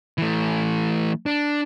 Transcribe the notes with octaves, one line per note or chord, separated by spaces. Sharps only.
E3 A3
D4